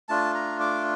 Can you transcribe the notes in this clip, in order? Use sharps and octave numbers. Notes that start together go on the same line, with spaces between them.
A3 D4 F4 A5
A#5
D6